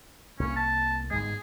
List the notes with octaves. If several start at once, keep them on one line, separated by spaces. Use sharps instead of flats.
C2 E3 A#3 C#4
A5
G1 G#2 G#3 G#4